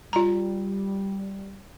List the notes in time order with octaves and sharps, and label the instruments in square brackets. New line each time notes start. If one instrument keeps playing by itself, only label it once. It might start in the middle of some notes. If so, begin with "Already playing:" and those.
[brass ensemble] G3 [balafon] F4 A#5